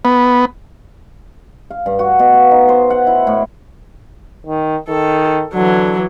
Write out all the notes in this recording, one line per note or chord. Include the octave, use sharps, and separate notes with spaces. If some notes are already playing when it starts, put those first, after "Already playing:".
B3
F5
G2
F#4
B2
F5
D#4
C5
F#5
E4
A2
D#3
D#3 A4
D3 E3 F#3